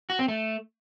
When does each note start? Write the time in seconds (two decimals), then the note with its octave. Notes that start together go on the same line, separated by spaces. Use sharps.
0.10 F#4
0.19 C4
0.28 A3